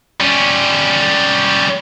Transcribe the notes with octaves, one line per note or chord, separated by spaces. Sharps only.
G3 C#4